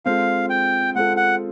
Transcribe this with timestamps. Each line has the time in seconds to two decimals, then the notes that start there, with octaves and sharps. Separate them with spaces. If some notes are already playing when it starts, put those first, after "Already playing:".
0.05 G#3 C4 F4 A4 F5
0.50 G5
0.95 G#3 C4 F4 A4 F#5
1.17 F#5